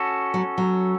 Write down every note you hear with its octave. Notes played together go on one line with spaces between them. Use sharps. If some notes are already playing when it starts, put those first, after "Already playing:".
Already playing: C#4 F#4 A4
F#3
F#3